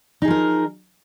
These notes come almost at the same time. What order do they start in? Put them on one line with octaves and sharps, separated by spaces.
D#4 G#4 F3 A#4